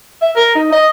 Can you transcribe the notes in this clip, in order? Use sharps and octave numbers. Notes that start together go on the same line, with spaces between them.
E5
A#4
D#4
D#5